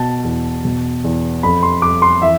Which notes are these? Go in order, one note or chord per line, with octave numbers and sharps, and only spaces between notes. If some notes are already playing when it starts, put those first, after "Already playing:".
Already playing: B2 A5
E2
B2
E2
F2 B5
C6
F2 D6
C6
E3 E5